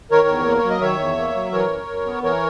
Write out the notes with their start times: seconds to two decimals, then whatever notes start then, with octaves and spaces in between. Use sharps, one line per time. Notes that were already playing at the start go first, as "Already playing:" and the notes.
0.11 D#3 A#4 C#5
0.28 E2
0.46 A#3
0.57 C#5
0.64 F#3
0.70 D#5
0.81 D#3 C#5 E5
0.99 E2
1.18 A#3
1.35 F#3
1.52 E3 A#4 C#5
1.70 F#2
1.87 F#2
2.06 B3
2.23 E3 A#4 C#5